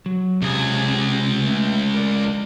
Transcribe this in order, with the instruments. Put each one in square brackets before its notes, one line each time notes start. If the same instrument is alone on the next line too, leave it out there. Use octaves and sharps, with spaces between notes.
[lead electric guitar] F#3
[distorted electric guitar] C#2 G#4 [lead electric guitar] C3
[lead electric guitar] A3
A#4 D5